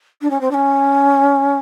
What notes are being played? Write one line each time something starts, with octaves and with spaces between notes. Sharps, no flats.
D4
C#4
C4
D4
C#4